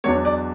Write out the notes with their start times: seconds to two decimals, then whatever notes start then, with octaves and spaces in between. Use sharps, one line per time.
0.04 E2 B2 F#3 B3 D4 C#5
0.25 D5